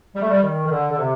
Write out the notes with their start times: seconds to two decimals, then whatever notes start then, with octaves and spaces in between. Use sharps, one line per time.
0.16 G3
0.22 A3
0.30 G3
0.43 D#3
0.66 D#3
0.71 D3
0.91 D3
0.98 C3